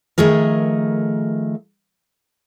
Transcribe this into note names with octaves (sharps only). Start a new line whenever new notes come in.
D#3 F3 A3 G#4 A#4